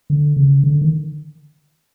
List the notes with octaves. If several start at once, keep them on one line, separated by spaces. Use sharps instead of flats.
D3
C#3
D3
D#3